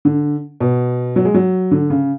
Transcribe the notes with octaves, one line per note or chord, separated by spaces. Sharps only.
D3
B2
F#3
G#3
F#3
D3
C#3